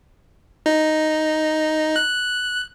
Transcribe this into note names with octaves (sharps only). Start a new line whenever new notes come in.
D#4
F#6